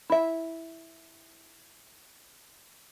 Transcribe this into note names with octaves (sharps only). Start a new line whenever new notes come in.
E4 E5